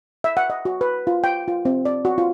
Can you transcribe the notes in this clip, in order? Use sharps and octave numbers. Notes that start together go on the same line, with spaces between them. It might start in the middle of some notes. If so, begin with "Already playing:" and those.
E5
F#5
D#5
F#4
B4
F4
G5
F4
C4
D5
F#4
F4